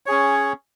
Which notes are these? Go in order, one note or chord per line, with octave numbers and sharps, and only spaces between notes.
C#4 G#4 C#5